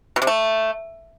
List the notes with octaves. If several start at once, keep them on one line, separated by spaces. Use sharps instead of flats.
B2
C3
A3